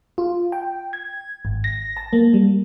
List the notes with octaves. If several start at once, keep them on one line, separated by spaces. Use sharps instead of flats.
F4
G5
G#6
G#1
A#6
A5
A#3
G3